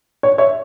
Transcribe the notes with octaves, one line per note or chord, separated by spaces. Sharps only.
C#5
C#5 E5